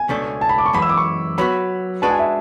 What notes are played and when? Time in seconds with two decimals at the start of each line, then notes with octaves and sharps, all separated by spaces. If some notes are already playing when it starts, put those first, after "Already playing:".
Already playing: G#5
0.09 C#2 B2 A3 D4 A4
0.41 A5
0.49 B5
0.58 D6
0.66 C#6
0.73 F#2 E3 G#3 B5
0.82 E6
0.90 D6
0.97 C#6
1.38 F#3 B3 F#4 B4 B5
2.02 G#3 D4 F#4 B4 A5
2.10 G#5
2.19 E5